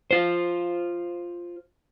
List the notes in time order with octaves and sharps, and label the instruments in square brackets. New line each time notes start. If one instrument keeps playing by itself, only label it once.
[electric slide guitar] F4 C5